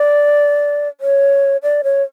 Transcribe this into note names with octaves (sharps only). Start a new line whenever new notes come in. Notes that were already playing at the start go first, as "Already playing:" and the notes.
Already playing: D5
C#5
D5
C#5